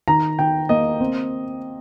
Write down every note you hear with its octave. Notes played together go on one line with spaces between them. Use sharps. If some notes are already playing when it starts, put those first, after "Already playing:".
D#3 A#5
D#3 G5
A#3 D#5
C4